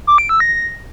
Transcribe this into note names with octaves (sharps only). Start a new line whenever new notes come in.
D6
D7
E6
A#6